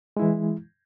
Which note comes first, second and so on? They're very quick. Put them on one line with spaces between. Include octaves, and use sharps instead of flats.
G#3 E4 E3